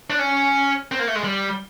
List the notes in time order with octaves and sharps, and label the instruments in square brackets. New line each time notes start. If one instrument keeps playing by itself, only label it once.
[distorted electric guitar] D4
C#4
C4
A#3
A3
G#3
G3